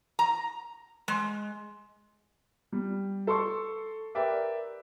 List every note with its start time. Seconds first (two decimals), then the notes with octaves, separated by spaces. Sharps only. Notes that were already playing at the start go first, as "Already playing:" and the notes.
0.19 A#5
1.08 G#3
2.72 G3
3.27 A4 C6 C#6
4.15 G4 A#4 B4 D5 E5 G5